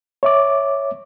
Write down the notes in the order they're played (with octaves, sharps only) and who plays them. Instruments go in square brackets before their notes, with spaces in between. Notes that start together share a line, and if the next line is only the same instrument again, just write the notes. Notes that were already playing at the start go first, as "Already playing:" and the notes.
[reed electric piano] C#5 E5 D6